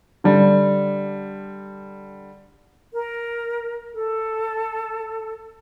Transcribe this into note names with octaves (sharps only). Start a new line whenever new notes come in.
D3 G3
A#4
A4